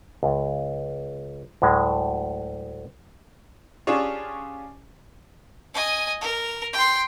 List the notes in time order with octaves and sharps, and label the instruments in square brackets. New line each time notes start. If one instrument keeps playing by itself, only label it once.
[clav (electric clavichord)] C#2
D2 A2 F#3 G#3
[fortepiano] C#4 D4 F4 G4 G#4 C#5
[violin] D#5 G#5
A#4
G5 C6